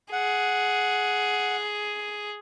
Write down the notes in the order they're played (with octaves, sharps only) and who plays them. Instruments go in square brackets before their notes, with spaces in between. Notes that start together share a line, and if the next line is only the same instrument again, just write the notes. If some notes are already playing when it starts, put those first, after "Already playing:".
[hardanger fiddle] G#4 [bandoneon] F#5